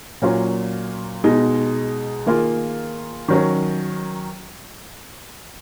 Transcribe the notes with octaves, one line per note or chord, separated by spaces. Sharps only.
A#2 F#3 C#4 F4
B2 G#3 D#4
D#3 A#3 F4 G#4
D#3 F#3 C#4